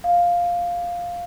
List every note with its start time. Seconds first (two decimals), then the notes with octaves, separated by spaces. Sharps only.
0.04 F5